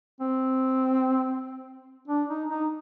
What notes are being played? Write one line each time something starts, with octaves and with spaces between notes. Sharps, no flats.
C4
D4
D#4
D#4